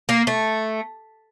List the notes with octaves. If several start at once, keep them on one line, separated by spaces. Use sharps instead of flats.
A#3
A3